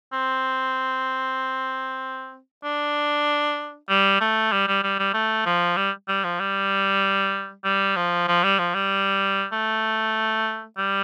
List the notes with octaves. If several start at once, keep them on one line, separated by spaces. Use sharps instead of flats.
C4
D4
G3
A3
G3
G3
G3
G3
A3
F3
G3
G3
F3
G3
G3
F3
F3
G3
F3
G3
A3
G3